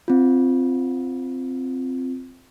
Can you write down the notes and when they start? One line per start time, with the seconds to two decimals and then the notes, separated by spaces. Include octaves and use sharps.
0.08 C4 F4